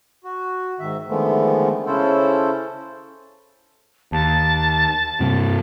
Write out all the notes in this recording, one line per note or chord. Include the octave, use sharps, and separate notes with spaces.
F#4
G#2 D#3 E5
D3 D#3 F3 G#3 A3 B3
C#3 C#4 E4 A4 C5
D#2 A5
G2 C3